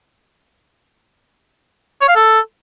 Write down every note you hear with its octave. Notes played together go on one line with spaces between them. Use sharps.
C#5
F5
A4